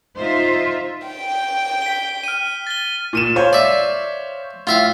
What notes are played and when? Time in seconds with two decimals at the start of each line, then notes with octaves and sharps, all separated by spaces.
0.17 D#4 F4 C5 E5
1.07 G5
1.82 B6 G7
2.24 F6 D#7
2.67 A6 G7
3.13 A#2 D#7 E7
3.36 C5 C#5 F5
3.53 D5 E5
4.67 A2 F4 E5 F5